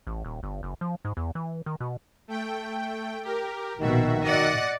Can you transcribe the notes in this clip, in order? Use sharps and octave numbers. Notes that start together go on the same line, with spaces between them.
A1
D#1
G1
F#1
F3
G#2
E2
E3
D#3
B2
A3 G5
G4 A#4
A#1 B2 D#3 F#4 E5
D5 D#5 F#5